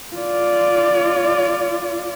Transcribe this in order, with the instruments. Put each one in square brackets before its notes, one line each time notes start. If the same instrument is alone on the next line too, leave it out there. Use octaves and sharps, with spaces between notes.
[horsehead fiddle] F4 D5